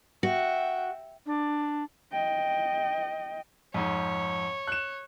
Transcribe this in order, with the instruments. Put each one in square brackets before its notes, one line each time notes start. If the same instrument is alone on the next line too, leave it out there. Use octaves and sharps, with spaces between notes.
[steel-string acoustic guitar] F#4 [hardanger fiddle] E5 G5
[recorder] D4
[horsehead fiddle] D#5 G5
[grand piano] F2 G#2 [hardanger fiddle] C#5
[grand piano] F#6 E7